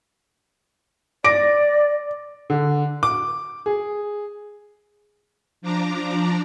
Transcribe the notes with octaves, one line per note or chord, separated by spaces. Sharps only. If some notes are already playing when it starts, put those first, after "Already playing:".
D5 D6 A#6 D7
D3
D6
G#4
F3 D4 D5 A#5